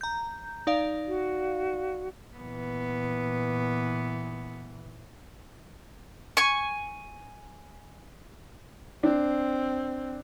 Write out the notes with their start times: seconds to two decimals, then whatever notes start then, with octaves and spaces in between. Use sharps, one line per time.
0.01 A#5 G6
0.67 D#4 D5 F5
1.07 F#4
2.37 A#2 E3 B3
6.37 G#5 C#6
9.03 C4 D4